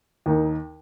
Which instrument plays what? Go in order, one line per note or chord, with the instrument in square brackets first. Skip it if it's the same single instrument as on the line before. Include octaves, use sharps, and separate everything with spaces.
[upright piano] D#2 D#3 A#3 D#4